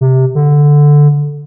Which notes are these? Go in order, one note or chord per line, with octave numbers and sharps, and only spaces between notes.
C3
D3